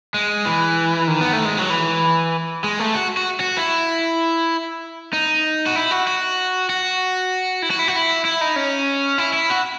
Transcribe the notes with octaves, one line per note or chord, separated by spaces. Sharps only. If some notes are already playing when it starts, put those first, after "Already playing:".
G#3
E3
D#3
B3
A3
G#3
F#3
E3
G#3
A3
F#4
F#4
F#4
E4
D#4
F#4
E4
F#4
F#4
F#4
E4
F#4
E4
F#4
E4
E4
D#4
C#4
E4
E4
F#4